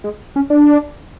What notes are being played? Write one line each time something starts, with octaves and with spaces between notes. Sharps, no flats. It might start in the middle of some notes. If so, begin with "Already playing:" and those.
G#3
C#4
D4